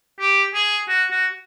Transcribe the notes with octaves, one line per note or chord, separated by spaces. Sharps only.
G4
G#4
F#4
F#4